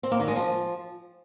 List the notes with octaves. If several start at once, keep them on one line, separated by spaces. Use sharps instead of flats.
C4
A#3
D#3
G#3
F3